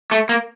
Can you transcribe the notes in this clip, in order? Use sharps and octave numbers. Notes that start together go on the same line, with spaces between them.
A3
A#3